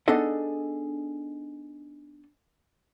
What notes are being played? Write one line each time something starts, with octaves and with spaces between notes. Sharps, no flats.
B3 D4 D#4 G#4 A4 D#5